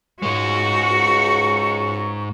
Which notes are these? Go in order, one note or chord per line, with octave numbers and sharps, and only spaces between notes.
C#2 G#2 G#3 F#4 C#6